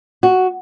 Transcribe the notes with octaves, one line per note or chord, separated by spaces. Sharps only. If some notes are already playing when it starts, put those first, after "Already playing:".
F#4